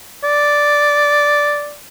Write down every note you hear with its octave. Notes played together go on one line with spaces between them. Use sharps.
D5